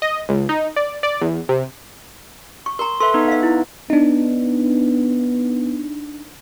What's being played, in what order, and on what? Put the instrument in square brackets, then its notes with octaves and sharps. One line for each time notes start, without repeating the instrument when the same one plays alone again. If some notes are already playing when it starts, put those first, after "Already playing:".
[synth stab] D#5
C#2
D#4
D5
D5
E2
C3
[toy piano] C#6
[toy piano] A#4 A#5 [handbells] C6
[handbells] A4 B4 E5 [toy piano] C6
[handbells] B3 D#4 B4
[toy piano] E5 F5
E4
[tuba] B3 [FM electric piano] D4 D#4